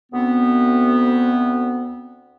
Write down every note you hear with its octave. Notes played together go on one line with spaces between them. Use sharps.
D2 B3 C4